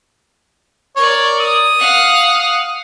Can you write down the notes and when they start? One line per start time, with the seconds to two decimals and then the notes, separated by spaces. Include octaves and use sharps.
0.96 A#4 C#5 D5
1.41 D#6
1.79 F5 F#5